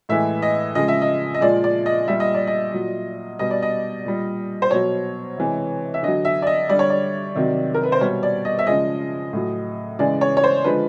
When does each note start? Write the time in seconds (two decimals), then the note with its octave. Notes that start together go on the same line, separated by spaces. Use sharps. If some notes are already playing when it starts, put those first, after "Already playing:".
0.09 A2 E3 G#3 E5
0.42 D#5
0.75 C#3 F3 G#3 D#5
0.88 E5
1.02 D#5
1.34 D#5
1.41 A#2 F3 G#3 D5
1.64 D5
1.86 D#5
2.08 A#2 G3 E5
2.20 D#5
2.34 D5
2.47 D#5
2.73 A#2 F#3
3.39 B2 G3 D#5
3.51 D5
3.63 D#5
4.05 A#2 G3
4.62 C5
4.71 B2 F#3 C#5
5.38 C3 E3 G#3
5.94 E5
6.03 D3 F#3 D#5
6.25 E5
6.42 D5
6.47 D#5
6.69 D3 G3 D5
6.79 C#5
6.90 D5
7.35 C3 D#3 F#3
7.74 A#4
7.83 B4
7.92 C5
8.01 B2 G3 C#5
8.23 D5
8.45 D#5
8.59 E5
8.67 C#3 F3 G#3 D#5
9.33 A2 F#3
9.99 C#3 E3 G#3 D5
10.21 C#5
10.37 C#5
10.44 C5
10.64 D3 F3 G#3 B4